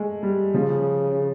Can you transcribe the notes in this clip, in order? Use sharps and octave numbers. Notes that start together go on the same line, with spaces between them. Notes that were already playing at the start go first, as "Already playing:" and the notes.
Already playing: G#3 A3
G3
C#3 F3